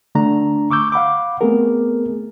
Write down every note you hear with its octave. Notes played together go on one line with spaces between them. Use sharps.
D3 A3 D4 A#5
C#6 D6 E6 G6
F5 F#5 B5 D6
A3 B3 C4 G#4 A#4